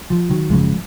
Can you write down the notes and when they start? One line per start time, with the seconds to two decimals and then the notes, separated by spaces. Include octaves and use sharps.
0.10 F3
0.30 D#3 F#3
0.50 G#1 F#2 C#3 F3 G#3